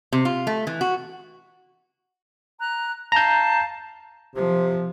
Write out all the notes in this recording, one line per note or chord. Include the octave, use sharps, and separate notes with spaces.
C3
F4
A3
E3
F#4
A#5 F#6
F5 A5 A#5 G6
C3 F3